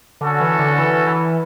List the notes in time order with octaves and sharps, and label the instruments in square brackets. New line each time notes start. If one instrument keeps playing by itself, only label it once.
[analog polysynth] D3 [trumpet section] C#4 F#4 A4
[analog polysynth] E3
D3
E3
E3